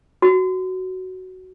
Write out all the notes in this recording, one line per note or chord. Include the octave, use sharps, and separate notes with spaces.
F#4